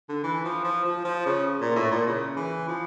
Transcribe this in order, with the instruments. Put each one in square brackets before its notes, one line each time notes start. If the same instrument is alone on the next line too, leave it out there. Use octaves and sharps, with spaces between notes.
[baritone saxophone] D3
E3
F3
F3
F3
F3
C#3
A#2
A2
A#2
C#3
E3
F3